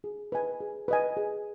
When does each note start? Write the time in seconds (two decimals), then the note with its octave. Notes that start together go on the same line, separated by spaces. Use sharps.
0.04 G#4
0.32 B4 D#5 G#5
0.60 G#4
0.88 B4 D#5 G#5
1.17 G#4